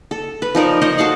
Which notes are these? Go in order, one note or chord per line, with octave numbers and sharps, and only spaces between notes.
A4
B4
F3 D#4 A#4 D5
D#4 C5 C#5 D#5
F#4 A4 F5 F#5